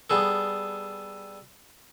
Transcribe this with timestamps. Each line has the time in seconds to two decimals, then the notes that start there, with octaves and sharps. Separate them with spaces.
0.10 G3 B3 G#4 A4